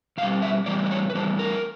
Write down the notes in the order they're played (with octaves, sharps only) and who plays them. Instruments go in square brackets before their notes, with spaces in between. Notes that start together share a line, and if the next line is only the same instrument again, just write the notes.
[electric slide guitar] B2 F5
G3
E5
A2 E3 G3 D5
D5
C#5
B4
A2 E3 G3 C5
A#4